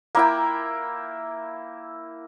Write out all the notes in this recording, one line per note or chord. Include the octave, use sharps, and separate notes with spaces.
A#3 E4 G5